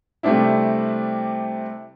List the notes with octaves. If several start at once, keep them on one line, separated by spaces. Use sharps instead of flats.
C3 G3 A3 C4 D4 E4